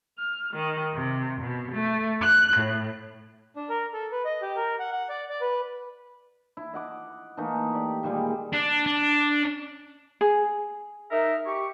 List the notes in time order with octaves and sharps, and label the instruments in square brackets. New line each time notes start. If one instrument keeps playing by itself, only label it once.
[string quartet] F6
D#3
C3
B2
A3
F#6
A2
[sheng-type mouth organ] D4
A#4
A4
B4
D#5
G4
A#4
F#5
F#5
D5
D5
B4
[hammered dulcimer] E4
D#5 F#5 D6
E3 A3 A#3 D#4
G4 D5
A#2 D#3 G3 G#3
[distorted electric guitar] D4
D4
[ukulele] G#4
[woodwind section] D#4 A#4 E5
G4 C#6